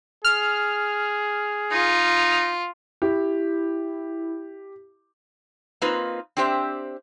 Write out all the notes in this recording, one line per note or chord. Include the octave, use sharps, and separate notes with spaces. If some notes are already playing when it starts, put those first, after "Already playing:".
G#4 F6
D#4 F4
E4 G4
A#3 C4 D#4 F4 B4
C4 D4 G4 C5 E5